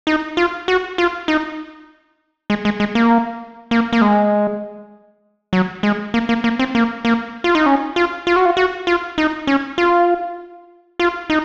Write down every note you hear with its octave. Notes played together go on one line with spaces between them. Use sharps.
D#4
F4
F#4
F4
D#4
G#3
G#3
G#3
A#3
A#3
A#3
G#3
F#3
G#3
A#3
A#3
A#3
C4
A#3
A#3
F4
D#4
C#4
F4
F4
F#4
F4
F#4
F4
D#4
C#4
F4
F4
D#4